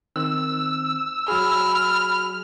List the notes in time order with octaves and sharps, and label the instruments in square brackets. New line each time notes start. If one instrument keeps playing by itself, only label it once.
[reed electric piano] D#3 C4 F#6 [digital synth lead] E6
[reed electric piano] F#3 F#4 G#4 [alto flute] B5 [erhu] F6